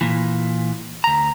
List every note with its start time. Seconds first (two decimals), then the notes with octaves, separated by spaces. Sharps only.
0.01 A#2 E3
1.04 D2 A#5